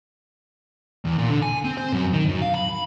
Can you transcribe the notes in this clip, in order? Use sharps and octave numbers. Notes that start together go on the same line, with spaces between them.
E2
A#2
D3
G#5
C4
C5
F#2
D#3
F#2
F5
B5